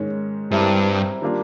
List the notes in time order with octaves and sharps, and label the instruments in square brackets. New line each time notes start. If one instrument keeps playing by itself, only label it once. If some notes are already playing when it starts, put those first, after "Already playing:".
Already playing: [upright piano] G#2 D#3 G#3 C#4
[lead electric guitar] G2 [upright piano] G3 C4 E4 G4 A#4
[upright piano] D#3 G3 A#3 D4 F4